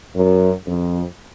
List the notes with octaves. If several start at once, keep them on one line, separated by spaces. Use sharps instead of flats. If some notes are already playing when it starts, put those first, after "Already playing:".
F#2
F2